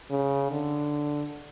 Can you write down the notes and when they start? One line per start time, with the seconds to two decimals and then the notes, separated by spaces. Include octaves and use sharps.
0.11 C#3
0.51 D3